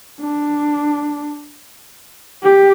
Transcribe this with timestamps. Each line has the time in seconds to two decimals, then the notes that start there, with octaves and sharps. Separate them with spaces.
0.20 D4
2.43 G4